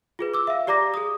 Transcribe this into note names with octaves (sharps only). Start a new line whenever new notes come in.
F4 G#4 B4
D6 E6
E5 F5
G4 D5 A#5 D6 A#6
G#4 D#6